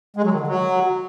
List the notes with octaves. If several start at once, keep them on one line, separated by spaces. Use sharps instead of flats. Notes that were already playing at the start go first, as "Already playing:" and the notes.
G#3
F#3
D#3
D3
F#3